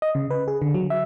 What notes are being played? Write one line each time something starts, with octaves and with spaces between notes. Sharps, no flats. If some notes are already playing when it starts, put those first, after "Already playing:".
D#5
C#3
B4
G#4
D3
F#3
E5